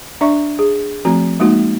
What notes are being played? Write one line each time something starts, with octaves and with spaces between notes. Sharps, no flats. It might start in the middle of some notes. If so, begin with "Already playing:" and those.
D4 D5 E5 C#6
G#4
F3 A3 C4 F#4 A#5
G#3 A#3 D#4 F#4